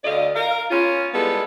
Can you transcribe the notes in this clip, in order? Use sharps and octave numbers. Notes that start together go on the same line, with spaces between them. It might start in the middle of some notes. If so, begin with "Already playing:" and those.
D2 D3 D5 D#5 F5
A#4 F5
B3 C#4 F4
G3 G#3 B3 E4 A4